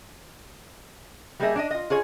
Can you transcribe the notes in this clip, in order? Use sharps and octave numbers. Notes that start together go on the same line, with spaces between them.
G3 A#3 G4 G#4 D#5 E5
D4 D5 D#5
F4 D#5
F4 G#4 C#5